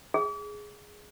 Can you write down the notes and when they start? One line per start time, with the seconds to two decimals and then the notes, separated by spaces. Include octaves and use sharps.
0.14 G#4